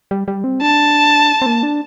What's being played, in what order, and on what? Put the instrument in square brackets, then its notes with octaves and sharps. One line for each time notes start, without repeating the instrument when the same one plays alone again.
[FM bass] G3
G3
C4
[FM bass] D4 [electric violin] A5
[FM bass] C4
A#3
D4